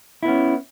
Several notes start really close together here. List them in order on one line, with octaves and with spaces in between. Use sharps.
E4 B3 C#4